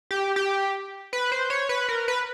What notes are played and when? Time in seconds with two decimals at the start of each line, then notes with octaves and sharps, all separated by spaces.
0.11 G4
0.36 G4
1.13 B4
1.32 C5
1.50 C#5
1.69 B4
1.89 A#4
2.08 B4